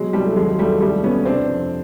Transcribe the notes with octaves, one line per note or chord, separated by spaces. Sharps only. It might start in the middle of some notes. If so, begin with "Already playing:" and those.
Already playing: B2 F#3 G#3
C2 G3
A3
D#2 F#3 G#3
D#2 G3 A3
C2 G3 A3
B2 B3 C#4
C3 C4 D4
F2